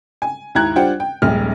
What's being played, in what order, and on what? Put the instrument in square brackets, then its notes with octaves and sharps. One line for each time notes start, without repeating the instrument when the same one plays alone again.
[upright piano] G#5
D#2 G#2 E4 A#5 F#6 G#6
G3 D4 F4 C5 F#5 G5
G5
D#1 A#1 G#3 F6